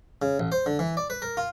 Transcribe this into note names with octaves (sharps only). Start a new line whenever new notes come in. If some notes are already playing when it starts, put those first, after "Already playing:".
C#3
A1
C5
D3
E3
D5
B4
A#4
F4